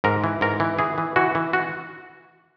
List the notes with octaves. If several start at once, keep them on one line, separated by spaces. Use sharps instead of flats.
G#2 A#4
E3
G#2 A#4
E3
E3 G#4
E3
E3 F#4
E3
F#4